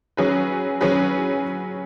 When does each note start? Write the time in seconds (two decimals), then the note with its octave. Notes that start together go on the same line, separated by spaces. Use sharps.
0.17 F#3 C#4 G#4 B4
0.81 F#3 C#4 G#4 B4